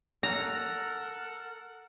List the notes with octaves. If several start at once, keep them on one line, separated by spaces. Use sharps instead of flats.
A4 A#4 F#5 A#5